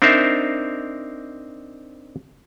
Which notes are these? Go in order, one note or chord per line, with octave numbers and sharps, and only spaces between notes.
C4 D4 D#4 A#4 C5 E5